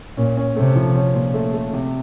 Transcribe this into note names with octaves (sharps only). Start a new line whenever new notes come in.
A#2 C#4
C#4
C3 A3
F3
C#4
A#2
A3
A3
C3